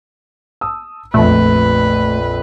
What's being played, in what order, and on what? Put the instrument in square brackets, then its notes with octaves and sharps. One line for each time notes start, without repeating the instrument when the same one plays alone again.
[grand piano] A5 D#6 E6
[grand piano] A#1 F2 [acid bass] A3 [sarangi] B4